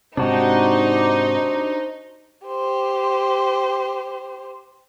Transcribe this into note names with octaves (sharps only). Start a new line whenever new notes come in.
G#2 C3 D4 D#4 F#4 G4 C5
G4 C5